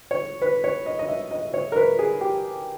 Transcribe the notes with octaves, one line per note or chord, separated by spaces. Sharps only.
C#5
B4
C#5
D#5
D#5
E5
D#5
C#5
A#4
B4
G#4
G4